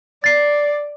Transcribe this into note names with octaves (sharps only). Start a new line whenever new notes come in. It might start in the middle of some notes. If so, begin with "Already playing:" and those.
D5 A6 C7